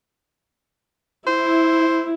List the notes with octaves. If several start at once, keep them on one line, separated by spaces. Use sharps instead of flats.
E4 C5